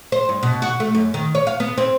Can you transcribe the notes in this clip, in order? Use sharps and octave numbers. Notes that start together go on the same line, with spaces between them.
C5
G2
B2
F#4
A3
F#2
D#3
C#5
F5
B3
C4